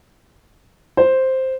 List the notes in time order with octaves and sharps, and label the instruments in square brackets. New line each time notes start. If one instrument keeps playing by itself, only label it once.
[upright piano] C5